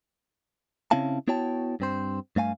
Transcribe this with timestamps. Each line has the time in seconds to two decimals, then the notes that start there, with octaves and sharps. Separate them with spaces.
0.91 C#3 C4 C#4 E4 F5 A5
1.28 B3 E4 F#4 C#5 G5 A5
1.80 G2 C4 C5
2.36 G2 A3 F5 G#5